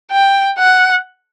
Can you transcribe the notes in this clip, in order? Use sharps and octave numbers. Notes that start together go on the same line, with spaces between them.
G5
F#5